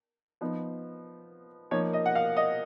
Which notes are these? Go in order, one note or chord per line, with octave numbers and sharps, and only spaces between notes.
F3 B3 D#4
F3 A#3 D#4 C#5
D#5
F#5
F5
D#5